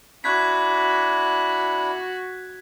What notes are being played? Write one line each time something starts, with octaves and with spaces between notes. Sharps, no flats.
D4 E4 F#4 F#6 G#6 B6